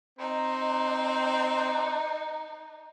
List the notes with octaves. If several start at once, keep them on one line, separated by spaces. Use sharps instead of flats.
C4 D#4